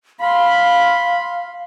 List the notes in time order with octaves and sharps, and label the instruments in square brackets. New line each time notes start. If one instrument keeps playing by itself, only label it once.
[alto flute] F5 [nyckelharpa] B5 C6